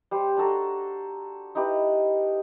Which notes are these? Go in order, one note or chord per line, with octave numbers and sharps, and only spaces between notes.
G3 C5
D4 F#4 A4 A#5
D#4 E4 G4 B4